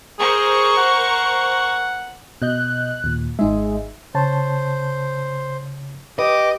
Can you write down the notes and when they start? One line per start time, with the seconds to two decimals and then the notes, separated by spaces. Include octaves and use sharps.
0.19 G#4 A#4 C5 C#6
0.77 F#5
2.42 B2 D#5 F#6 G6
3.04 D#2 A#2
3.39 G#1 G#3 D#4 E5
4.15 C#3 C5 C#5 A5
6.19 G4 B4 D#5 D6